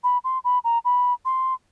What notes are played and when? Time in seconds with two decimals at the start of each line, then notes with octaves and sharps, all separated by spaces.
0.04 B5
0.24 C6
0.44 B5
0.64 A#5
0.85 B5
1.25 C6